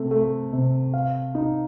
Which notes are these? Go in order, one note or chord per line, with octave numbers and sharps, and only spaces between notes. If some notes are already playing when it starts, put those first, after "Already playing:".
Already playing: C3 A3
A3
C3
F5
D#4